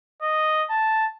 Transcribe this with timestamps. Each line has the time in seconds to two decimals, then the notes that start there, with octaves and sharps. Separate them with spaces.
0.22 D#5
0.70 A5